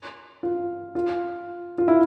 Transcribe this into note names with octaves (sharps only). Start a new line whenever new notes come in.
F4
F4
F4
E4